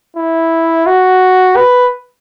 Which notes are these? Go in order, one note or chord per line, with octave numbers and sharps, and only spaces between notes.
E4
F#4
B4